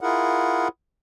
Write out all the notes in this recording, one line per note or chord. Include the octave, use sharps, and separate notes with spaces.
E4 F4 G#4 A#4 F#5